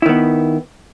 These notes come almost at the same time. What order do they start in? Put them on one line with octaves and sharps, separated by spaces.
E4 D#3 B3